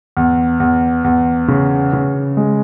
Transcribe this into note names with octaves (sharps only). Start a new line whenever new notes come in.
E2
E2
E2
C#3
C#3
G#3